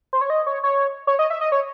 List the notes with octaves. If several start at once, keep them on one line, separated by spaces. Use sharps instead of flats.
C5
C#5
D#5
C#5
C#5
C#5
D#5
E5
D#5
C#5